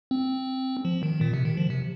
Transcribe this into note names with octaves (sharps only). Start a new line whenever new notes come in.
C4
F3
D#3
A#2
C3
D#3
F3
C3